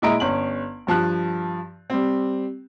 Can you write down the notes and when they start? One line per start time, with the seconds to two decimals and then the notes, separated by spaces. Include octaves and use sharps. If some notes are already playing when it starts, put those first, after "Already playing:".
0.02 A#2 G#3 E4 D#5 A#5 D7
0.20 G1 C#4 F#7
0.87 G2 F3 A5 F#6
1.90 G3 C4